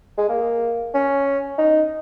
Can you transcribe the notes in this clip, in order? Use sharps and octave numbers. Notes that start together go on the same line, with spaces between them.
G#3
A#3
C#4
D#4